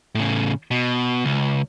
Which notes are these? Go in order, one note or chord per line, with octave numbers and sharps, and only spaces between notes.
A2 C#3
B2
C#2